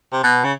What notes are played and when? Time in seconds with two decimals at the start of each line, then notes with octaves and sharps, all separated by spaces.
0.13 C3
0.23 B2
0.44 C#3